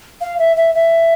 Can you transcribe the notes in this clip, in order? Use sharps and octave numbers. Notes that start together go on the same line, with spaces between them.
F5
E5
E5
E5